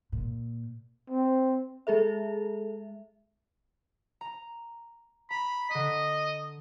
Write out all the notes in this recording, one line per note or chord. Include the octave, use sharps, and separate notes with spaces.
A#2
C4
G#3 G#4 A4 E5
A#5
A#5 B5
D3 D#5 B6